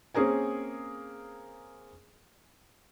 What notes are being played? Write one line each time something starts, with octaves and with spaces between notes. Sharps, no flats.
A#3 C4 C#4 G#4 A#4 G#5